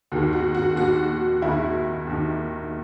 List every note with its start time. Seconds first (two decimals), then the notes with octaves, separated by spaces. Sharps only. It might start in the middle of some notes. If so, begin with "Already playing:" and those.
0.12 D#2 D#3 F#4
0.33 F#4
0.55 F#4
0.76 D#2 D#3 F#4
1.42 D#2 D#3 E4
2.07 D#2 D#3